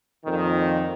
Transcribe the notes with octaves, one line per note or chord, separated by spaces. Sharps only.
F2 A#2 D#3